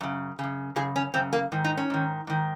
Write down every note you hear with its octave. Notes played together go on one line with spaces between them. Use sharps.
F#2 C#3
F#2 C#3
F#2 C#3 G#4
C#4
F#2 C#3 C4
A#3
G#2 D#3
D#4
C#4
G#2 D#3
G#2 D#3